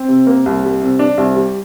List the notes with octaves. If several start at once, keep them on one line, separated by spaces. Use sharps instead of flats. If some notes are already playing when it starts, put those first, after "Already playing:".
Already playing: C4
C3
A#3
C2
G3
C3
D4
C2
G3